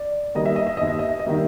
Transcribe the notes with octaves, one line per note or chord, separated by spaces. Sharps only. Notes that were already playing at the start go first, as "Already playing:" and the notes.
Already playing: D5
D#3 G3 A#3 D#5
E5
D#5
E5
D#2 D#5
E5
D#5
E5
D#5
D#3 G3 A#3 E5